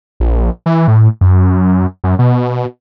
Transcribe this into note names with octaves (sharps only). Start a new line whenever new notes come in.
A#1
E3
A2
F#2
F#2
B2